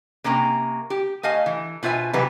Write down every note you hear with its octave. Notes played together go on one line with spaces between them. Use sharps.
C3 A#3 C#4 A#5
G4
A3 D#5 F5 G#5
E3
B2 F4 C5 E5 G#5
C3 E3 F#3 G3 B3 B4